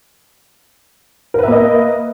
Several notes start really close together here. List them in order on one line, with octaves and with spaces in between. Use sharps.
A#4 B4 E5 A#3 D#5